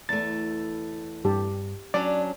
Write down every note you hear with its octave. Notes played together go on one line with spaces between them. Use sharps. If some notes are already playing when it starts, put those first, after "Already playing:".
E2 A3 A6
G2 G4 A5
F#3 C#4 D4 D5